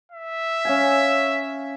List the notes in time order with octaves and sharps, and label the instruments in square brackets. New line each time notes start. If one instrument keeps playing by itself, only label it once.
[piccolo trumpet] E5
[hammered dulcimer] C#4 F5 G#5